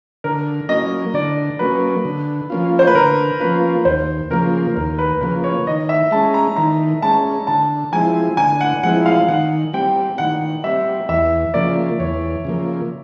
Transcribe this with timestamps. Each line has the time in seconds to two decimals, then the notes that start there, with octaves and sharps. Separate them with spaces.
0.24 D3 A#4
0.69 F#3 A#3 C#4 D#5
1.14 D3 D5
1.59 F#3 A#3 C#4 B4
2.05 D3
2.50 F3 A#3 C#4 F4
2.79 C5
2.87 B4
2.95 D3 A#4
3.40 F3 A#3 C#4 F4 B4
3.85 D#2 C5
4.30 C#3 F3 A#3 A#4
4.76 D#2 A#4
4.99 B4
5.21 C#3 F3 A#3 B4
5.44 C#5
5.67 D#3 D#5
5.89 E5
6.11 G#3 C#4 A5
6.34 A#5
6.56 D#3 A#5
7.02 G#3 C#4 A5
7.47 D3 A5
7.92 F3 G#3 C4 E4 G#5
8.37 D3 G#5
8.61 F#5
8.83 F3 G#3 C4 E4 F#5
9.06 F5
9.28 D#3 F#5
9.73 G3 C4 G5
10.18 D#3 F#5
10.64 G3 C4 E5
11.09 E2 E5
11.54 C#3 F3 A#3 D5
11.99 E2 C#5
12.45 C#3 F3 A#3